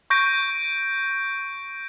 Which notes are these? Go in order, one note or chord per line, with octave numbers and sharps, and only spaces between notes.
C#6 G6 A#6 D7